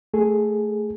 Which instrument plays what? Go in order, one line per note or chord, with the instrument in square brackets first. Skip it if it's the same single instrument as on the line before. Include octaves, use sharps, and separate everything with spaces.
[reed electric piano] A3 G#4 A4